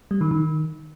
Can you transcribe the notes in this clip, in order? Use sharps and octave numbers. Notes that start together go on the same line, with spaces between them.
G3
D#3
D#3